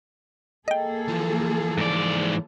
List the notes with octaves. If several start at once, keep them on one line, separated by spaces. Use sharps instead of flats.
A#3 G#4 A4 D#5 G5
E3 F3
G#2 D5